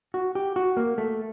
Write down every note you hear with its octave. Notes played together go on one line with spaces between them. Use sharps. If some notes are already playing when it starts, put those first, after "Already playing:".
F#4
G4
F#4
A#3
A3